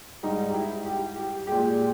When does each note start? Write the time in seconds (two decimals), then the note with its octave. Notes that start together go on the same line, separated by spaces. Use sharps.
0.23 G#2 G3 D#4
0.50 G4
0.54 E4
0.86 G4
1.16 G4
1.47 A#2 G#3 G4